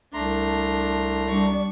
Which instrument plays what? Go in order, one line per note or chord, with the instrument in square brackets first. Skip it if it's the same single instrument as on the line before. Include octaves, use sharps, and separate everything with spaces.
[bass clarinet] C2 [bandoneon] A3 A#5 C6 [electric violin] D4
[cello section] G3 D4 [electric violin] C#6